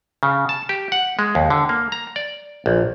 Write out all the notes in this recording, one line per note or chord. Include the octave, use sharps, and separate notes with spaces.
C#3
A5
G4
F#5
G#3
D#2
D3
A#3
A#5
D5
A#1